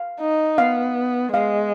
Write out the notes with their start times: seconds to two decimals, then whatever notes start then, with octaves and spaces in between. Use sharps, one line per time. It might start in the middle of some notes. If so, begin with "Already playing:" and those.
Already playing: F5
0.21 D#4
0.58 B3 F5
1.33 G#3 F5